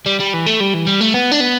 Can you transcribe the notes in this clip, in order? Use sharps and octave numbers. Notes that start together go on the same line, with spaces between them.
G3
G3
E3
A3
G3
E3
G3
A3
B3
D4
B3